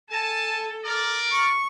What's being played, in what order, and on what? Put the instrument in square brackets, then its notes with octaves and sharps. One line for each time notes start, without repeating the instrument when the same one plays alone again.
[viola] A4 [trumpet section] G#5 A5
[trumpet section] A#4 D5
[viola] C#6